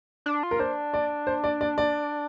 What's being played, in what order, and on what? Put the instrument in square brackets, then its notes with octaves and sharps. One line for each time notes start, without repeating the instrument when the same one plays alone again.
[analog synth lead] D4
F4
[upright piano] A#4
[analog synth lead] D4 [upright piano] C5
[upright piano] D5
C5
D5
D5
D5